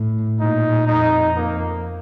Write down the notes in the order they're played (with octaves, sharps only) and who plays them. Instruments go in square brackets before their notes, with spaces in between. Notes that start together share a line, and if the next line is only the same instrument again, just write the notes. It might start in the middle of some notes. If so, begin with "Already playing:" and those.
Already playing: [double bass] A2
[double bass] A#2 [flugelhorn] D#4
[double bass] F2 [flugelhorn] D#4
[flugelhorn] A#3